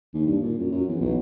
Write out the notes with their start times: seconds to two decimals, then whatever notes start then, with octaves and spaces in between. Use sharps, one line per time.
0.14 D#2
0.27 G2
0.43 A#2
0.59 F#2
0.72 F#2
0.89 E2
1.01 B1